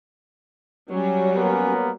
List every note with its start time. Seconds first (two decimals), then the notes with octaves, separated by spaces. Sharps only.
0.91 F#3 G3 C#4
1.36 A#3 B3 A#4